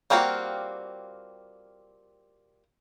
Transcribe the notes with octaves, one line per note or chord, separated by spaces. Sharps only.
G3 A#3 C4 F4 F#4